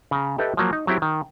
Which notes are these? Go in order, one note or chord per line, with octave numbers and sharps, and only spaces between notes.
C#3 A#5
G4 A4 B4 D#5 E5 G5
F3 F#3 A#3
D#4
F#3 C4 E4 G4
D#3